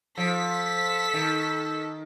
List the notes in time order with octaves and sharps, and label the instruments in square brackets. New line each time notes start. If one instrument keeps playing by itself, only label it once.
[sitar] F3 [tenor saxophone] A4 [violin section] B6
[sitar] D#3